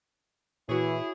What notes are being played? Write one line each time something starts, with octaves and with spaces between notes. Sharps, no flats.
A#2 E3 E4 F#4 G#4 C#5